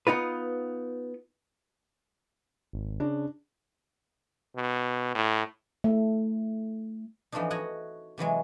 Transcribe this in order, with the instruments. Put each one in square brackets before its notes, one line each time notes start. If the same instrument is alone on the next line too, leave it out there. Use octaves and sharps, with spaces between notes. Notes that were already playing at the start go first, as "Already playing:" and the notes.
[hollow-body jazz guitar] B3 D#4 F4 B4
[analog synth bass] G#1
[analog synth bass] C#3 [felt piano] D4
[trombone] B2
A2
[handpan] A3
[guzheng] E3 F3 A3 C4 D4 D#4
F#4 C#5 D#5 F#5
C3 E3 F#3 G#3